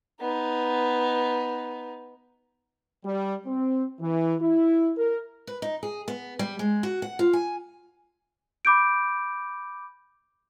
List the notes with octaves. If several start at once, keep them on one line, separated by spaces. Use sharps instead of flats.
B3 D#4
G3
C4
E3
E4
A#4
B4
D#4
G#4
B3
G3
G#3
F#4
F#5
F4
G#5
B5 D6 G6 D7